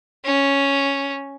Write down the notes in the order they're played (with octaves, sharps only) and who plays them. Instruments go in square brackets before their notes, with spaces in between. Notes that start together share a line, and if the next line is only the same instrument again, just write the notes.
[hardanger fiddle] C#4